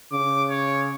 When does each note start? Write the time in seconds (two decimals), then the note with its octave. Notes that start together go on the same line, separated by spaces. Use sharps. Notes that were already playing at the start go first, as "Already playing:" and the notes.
0.13 C#3 D6
0.50 C#5